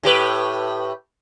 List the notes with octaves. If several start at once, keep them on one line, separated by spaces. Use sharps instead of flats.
A2 G4 B4